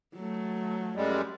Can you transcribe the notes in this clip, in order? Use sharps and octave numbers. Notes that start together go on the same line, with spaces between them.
F#3 A3
F#2 G3 G#3